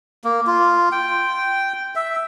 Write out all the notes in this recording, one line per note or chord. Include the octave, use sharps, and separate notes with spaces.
A#3
F4
G5
E5